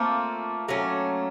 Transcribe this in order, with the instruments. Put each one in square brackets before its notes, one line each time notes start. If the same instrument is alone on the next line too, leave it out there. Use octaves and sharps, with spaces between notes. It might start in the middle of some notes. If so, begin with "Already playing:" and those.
Already playing: [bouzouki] A3 C4 F4 A4 [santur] A#3
[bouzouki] F#3 A3 C#4